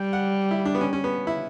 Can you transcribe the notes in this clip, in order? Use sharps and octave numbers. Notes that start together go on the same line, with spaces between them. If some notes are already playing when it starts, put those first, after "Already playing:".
Already playing: G3 G5
F#5
E4
D4
B3
C#4
C#4
B3
E4